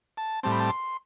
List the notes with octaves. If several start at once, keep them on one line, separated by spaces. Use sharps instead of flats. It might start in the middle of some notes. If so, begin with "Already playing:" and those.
A5
A2 G3 C4 A5
B5
A5
C6